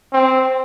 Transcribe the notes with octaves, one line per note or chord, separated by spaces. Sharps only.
C4